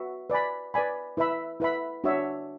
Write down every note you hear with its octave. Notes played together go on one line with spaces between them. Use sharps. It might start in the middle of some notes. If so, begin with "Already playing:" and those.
Already playing: F#4 B4 E5
B4 D5 G#5 B5
B4 D5 G#5 B5
E4 B4 E5 B5
E4 B4 E5 B5
D4 F#4 C#5 E5